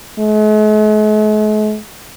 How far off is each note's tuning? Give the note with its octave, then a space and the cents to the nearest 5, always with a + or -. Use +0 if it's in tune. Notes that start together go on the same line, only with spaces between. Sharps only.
G#3 +45